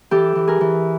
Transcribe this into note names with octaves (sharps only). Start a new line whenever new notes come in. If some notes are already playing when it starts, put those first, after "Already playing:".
E3 G4 A4
E3
G#4 A#4
E3